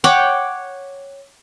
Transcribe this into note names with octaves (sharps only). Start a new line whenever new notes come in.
C#5 F#5 G5 D6